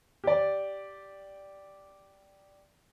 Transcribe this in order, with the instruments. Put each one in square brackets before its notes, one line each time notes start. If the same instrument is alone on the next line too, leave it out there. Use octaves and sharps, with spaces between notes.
[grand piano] G4 D5